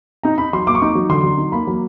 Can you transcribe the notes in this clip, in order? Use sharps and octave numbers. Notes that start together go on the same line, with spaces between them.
D#4 A#5
D#4 B5
F#3 C6
A#3 D6
C#6
D#4 D6
F#3
D3 C6
F#3
D#4
A#3 B5
F#3